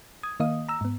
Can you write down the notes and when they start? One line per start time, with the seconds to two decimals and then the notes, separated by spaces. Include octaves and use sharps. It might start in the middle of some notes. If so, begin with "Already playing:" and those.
0.23 D#6 G#6
0.40 D#3 A#3 D#5 F5 D#6
0.69 A#5 E6
0.81 G#2 B3